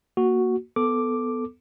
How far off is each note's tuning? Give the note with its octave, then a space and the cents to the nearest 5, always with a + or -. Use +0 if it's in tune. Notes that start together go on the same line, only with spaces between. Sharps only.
A#3 +0 F#4 +0
B3 +10 A4 +0 D6 +0